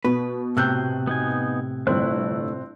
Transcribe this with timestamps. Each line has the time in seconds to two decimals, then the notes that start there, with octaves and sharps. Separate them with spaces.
0.05 B2 B4
0.57 A2 C3 E6 F#6 G6
1.07 B3 D#4 G#5
1.87 G1 A3 C4 E4 F#6